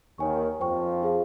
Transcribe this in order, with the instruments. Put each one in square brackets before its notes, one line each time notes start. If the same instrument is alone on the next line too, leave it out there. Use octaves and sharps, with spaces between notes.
[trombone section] D#2 D#3 [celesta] C#5 G#5 C#6
[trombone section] F2 F3 [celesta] C5 G5 C#6
[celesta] F4 G#4 C5 F5